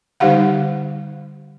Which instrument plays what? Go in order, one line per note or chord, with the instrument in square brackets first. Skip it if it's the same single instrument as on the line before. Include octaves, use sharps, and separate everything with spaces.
[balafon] D3 G3 D#4 G4 F5 F#5